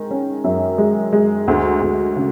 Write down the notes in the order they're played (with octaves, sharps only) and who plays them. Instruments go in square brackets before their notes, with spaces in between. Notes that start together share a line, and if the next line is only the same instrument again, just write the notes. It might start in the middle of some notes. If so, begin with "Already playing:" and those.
Already playing: [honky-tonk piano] D#3 G#3
C#4
F#2
G#3
G#3
D2
D2
C#3